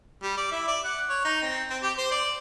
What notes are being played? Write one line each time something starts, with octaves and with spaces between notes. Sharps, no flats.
G3
D5
E4
D5
F#5
C#5
D#4
C4
C4
G4
C5
D5